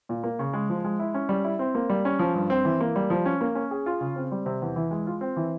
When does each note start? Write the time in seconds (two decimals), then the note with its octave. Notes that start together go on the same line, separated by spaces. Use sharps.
0.09 A#2
0.24 A#3
0.39 C#3
0.53 G#3
0.69 F3
0.84 G#3
1.00 E4
1.14 C#4
1.29 G3
1.44 E4
1.59 C4
1.75 A#3
1.90 G3
2.05 C#4
2.19 F3
2.35 G2
2.50 C4
2.65 E3
2.81 A#3
2.96 G3
3.10 F3
3.26 C#4
3.41 A#3
3.55 C#4
3.71 G#4
3.86 F4
4.01 C#3
4.16 C4
4.32 G3
4.46 C3
4.62 E2
4.76 E3
4.91 G#3
5.07 F4
5.21 C4
5.36 E3